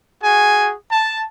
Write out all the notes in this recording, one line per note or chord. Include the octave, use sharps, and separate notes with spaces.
F#4 G#4 G#5
A5